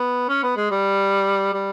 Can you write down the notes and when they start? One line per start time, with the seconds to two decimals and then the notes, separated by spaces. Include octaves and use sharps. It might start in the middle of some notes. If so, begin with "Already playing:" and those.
Already playing: B3
0.29 C#4
0.43 B3
0.57 G#3
0.71 G3
1.53 G3